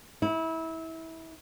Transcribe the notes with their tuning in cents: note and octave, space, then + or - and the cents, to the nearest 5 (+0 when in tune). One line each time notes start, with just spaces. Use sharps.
E4 -25